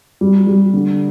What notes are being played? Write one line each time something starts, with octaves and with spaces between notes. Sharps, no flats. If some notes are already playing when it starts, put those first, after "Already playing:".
G3
G3
D3